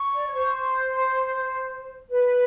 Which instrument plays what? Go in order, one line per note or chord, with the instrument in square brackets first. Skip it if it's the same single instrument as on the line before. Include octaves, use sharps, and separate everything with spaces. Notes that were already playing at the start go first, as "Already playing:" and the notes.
Already playing: [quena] C#6
[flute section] D5
C#5
C5
B4